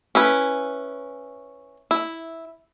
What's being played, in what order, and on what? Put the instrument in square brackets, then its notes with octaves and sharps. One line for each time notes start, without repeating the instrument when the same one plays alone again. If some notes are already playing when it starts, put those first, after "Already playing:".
[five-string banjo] C#4 E4 B4
E4